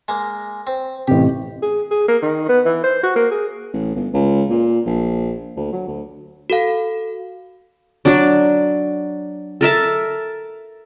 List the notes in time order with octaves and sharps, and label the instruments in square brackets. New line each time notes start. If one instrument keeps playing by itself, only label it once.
[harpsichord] G#3 A#3
C4
[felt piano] A1 C3 [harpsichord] G4
[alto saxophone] G#4
G#4
A#3
D#3
B3
E3
C5
F#4
A#3
G#4
[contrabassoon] A1
G1
C#2
A#2
A#1
D2
F#3
D2
[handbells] F#4 A4 F5
[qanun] F#3 D4 D5
A4 A#4 E5 A5